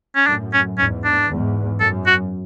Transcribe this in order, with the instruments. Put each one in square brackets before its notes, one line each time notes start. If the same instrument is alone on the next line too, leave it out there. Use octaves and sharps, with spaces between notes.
[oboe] C#4
[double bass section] F#2 A2 [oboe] D4
[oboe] C#4
[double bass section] E2 G#2 [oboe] C#4
[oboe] D4
[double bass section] E2 G#2
[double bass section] F#2 [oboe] A4
[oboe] F#4